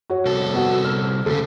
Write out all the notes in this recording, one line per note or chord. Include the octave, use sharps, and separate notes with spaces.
F#4 C#5
C2 A4
B3 F#4
F6
D2 C#3 A4